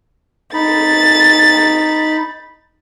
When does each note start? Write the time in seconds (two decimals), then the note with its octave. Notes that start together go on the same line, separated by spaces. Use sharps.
0.54 D#4 B5 A6